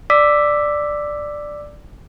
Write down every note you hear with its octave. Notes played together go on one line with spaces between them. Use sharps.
D5 D6 E6 B6